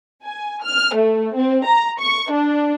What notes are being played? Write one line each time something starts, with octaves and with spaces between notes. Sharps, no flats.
G#5
F6
A3
C4
A#5
C#6
D4